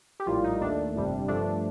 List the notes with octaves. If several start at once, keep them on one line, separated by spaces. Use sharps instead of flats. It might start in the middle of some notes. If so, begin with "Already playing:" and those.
G4
A#1 A2 G3 A#3 F4
D#4
D#2 D#3 A3 D4
G1 F2 C3 G3
G2 F3 A3 D4